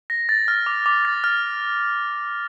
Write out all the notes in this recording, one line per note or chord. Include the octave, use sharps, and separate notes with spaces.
A#6
A6
F6
D6
D6
A6
F6